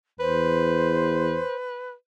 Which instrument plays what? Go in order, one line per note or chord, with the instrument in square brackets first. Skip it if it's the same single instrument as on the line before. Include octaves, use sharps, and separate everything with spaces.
[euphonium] E2 [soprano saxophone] B4 [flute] C5